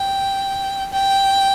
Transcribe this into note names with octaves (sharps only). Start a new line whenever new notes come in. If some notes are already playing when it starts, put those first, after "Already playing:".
Already playing: G5
G5